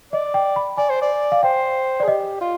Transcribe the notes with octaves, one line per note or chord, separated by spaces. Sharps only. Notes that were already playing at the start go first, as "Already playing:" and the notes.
D5 D#5
G5
B5
D5 G#5
C5
D5
F5
C5 G5
D5
G#4
G4 D#5
F4